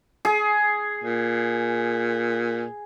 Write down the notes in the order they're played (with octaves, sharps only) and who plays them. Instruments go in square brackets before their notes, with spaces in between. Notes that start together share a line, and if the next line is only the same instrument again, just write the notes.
[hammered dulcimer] G#4
[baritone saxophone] A#2